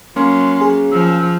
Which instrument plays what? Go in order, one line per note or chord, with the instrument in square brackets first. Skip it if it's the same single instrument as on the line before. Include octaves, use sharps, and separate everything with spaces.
[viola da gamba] F#3 [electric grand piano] A#3 C#4 [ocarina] C6
[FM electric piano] G#4
[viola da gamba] F3 [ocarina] E6